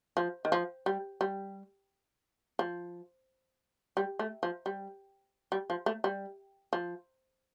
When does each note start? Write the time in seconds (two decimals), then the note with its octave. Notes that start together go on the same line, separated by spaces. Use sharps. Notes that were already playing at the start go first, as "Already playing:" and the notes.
0.17 F3
0.45 D#3
0.52 F3
0.86 G3
1.21 G3
2.59 F3
3.97 G3
4.19 A3
4.43 F3
4.66 G3
5.52 G3
5.70 F3
5.86 A3
6.04 G3
6.73 F3